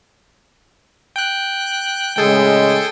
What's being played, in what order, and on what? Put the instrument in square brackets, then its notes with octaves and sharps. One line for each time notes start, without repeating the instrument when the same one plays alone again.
[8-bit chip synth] G5 F#6
[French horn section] A2 C#3 G#3 [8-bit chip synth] G#4 A4 G5